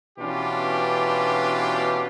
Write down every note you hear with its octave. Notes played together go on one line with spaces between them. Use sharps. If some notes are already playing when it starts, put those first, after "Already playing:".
B2 E3 C#4 D4 F4 G4